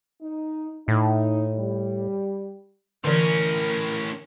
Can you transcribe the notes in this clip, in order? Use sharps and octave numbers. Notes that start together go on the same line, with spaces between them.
D#4
A2 D#4
G3
A2 D3 E3 C#4 A#4